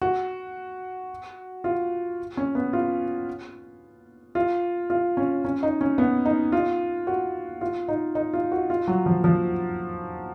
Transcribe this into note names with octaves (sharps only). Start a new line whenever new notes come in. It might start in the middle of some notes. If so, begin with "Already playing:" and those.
F#4
F4
C#4
B3
F4
F4
F4
C#4
C#4
D#4
C#4
B3
D#4
F4
F#4
F4
D#4
D#4
F4
F#4
F4
F#3
F3
F3